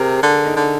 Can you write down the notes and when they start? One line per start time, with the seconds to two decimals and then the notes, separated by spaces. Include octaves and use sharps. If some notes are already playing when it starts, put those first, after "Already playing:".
Already playing: C3 G#4 A#4
0.23 D3
0.45 D#4
0.56 D3